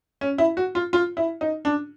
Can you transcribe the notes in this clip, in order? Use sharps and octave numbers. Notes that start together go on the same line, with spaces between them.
C#4
E4
F#4
F4
F4
E4
D#4
D4